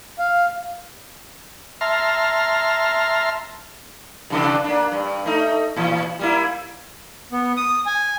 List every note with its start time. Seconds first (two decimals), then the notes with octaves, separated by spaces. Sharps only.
0.19 F5
1.81 E5 A5 A#5 C6 F6
4.30 G2 C3 D4
4.64 A#3 D4
4.92 G2
5.26 A3 D#4
5.76 A2 E3
6.19 G3 A#3 E4
7.32 B3
7.57 D#6
7.86 G#5